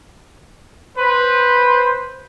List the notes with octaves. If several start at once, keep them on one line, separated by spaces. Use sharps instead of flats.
B4 C5